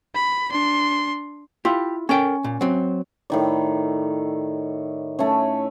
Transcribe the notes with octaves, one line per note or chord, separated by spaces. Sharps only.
B5
D4 C6
E4 F4 G4
C#4 A4 A#4 G5
A#2
F#3 C4
A2 D#3 D5
A3 C#4